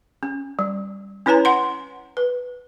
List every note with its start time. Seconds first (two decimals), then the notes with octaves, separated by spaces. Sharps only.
0.23 C#4
0.59 G3
1.26 C#4 E4 B4 C#5 G#5 A#5
1.45 F#5 C6
2.17 B4